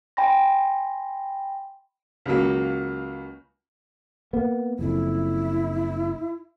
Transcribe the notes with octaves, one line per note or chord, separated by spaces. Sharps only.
G5 G#5 B5 C6 A#6
C#2 C#3 F#3 A#3
A#3 B3
F#1 F2 E4